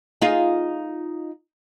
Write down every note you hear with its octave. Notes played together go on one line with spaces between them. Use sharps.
D#4 F4 G#4